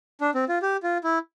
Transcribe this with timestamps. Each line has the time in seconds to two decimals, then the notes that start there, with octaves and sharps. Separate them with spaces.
0.21 D4
0.35 C4
0.49 F4
0.62 G4
0.83 F4
1.04 E4